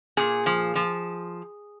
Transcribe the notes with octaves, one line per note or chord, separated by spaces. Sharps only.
A#2 G#4
F3
F3